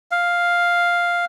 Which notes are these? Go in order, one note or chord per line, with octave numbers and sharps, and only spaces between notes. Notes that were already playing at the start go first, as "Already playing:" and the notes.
F5